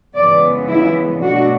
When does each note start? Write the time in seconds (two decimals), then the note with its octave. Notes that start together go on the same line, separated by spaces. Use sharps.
0.14 F#2 C#3 E3 G#3 B3 D5
0.68 E4
1.21 B2 F#3 A3 D4 F#4